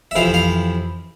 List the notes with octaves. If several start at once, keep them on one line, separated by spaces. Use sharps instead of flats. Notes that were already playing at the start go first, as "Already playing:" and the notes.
E5
F2 C3 E3 F5
F5